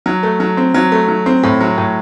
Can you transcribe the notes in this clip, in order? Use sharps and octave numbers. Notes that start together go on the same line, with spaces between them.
F#3
A3
F#3
C4
F#3
A3
F#3
C4
A2
F#3
A2